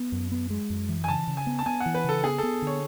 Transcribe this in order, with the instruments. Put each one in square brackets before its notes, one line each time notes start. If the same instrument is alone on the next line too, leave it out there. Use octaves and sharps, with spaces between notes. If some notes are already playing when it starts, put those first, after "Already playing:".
Already playing: [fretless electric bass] B3
F#2
B3
G#3
F#2
E3
[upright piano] G#5
[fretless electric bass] C#3 [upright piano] A5
[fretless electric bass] C#3
[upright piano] G#5
[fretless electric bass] B3
[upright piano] A5
[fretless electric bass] B3 [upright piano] G#5
[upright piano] F#5
[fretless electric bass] E3
[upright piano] B4
[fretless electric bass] C#3 [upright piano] A4
[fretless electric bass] B3 [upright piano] G#4
[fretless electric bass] B3 [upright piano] A4
[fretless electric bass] D3 [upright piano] C#5